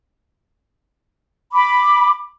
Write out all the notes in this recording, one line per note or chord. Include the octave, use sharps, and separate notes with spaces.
B5 D6